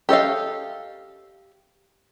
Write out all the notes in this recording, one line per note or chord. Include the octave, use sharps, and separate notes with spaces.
G4 A4 D#5 F5